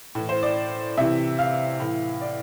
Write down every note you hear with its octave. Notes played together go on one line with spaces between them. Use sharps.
A2 E3
C5
D5
C3 E3 E5
F5
A2 E3
D5